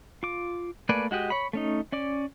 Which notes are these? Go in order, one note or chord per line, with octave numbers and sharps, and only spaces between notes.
F4 D6
A3 A#3 B4 D5 G#5
G#3 F#4 G4 D#5
C#5 B5
A3 C#4 D#4
C#4 D5 D6